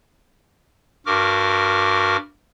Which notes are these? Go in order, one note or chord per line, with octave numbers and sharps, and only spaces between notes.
G2 F#4 A#4 D6 F6